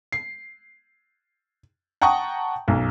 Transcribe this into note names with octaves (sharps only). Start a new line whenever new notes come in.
C7
F#5 G5 A5 A#5 C#6 D#6
B1 F#2